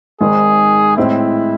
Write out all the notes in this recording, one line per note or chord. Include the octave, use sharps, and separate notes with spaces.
G#1 G#2 D#3 G#4
A2 G#3 C4 E4